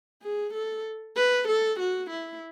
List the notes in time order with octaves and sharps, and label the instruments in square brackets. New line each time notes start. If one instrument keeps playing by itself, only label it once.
[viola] G#4
A4
B4
A4
F#4
E4